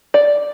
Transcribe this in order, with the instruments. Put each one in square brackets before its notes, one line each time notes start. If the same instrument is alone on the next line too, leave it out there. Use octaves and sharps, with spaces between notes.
[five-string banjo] D5